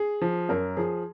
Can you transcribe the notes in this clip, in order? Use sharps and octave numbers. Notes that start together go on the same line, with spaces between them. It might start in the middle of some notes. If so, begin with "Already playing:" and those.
Already playing: G#4
F3
F#2 A#4
F3 G#4